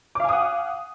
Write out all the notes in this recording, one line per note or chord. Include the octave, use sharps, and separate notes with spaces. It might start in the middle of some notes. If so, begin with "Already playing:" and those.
F5 F#5 G#5 D6 D#6